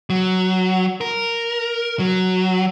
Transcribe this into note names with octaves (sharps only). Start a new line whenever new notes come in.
F#3
A#4
F#3